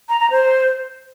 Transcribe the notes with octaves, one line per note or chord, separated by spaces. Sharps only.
A#5
A#5
C5